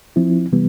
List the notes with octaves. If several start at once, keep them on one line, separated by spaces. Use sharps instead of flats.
F3 C4 E4
C3 E3 G3 B3